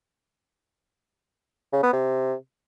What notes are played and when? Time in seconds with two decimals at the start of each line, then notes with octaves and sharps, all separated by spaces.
1.73 C#3
1.83 B3
1.93 C3